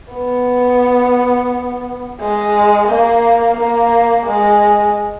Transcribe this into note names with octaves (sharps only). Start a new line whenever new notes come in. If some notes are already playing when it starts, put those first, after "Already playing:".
B3
G#3
A#3
A#3
G#3